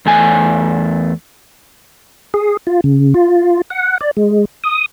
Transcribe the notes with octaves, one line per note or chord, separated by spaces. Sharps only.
E2 A3 G#5
G#4
F4
C#3
F4
F#5
D5
G#3
D#6